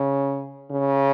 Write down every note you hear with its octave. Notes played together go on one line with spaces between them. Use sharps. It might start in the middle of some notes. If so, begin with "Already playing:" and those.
Already playing: C#3
C#3